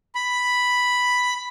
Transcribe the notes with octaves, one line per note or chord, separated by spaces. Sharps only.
B5